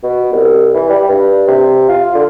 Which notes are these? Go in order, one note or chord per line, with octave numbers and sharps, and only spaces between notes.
B2
C2
E3
G3
G2
C3
F4
D3